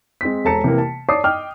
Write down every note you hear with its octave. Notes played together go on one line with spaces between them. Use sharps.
G#3 C4 B6
E1 A4 A5 A#5 C#7
C3 E3 A#3
A5
C#5 D5 A5 D6 D#6 C7
D#5 G5 D6 F6